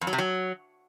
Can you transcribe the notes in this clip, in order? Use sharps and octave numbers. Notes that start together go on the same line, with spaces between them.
F2
F#3
C3
F#3